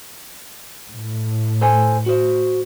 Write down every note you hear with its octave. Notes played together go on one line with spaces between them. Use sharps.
A2
A4 C5 G#5
F#4 C5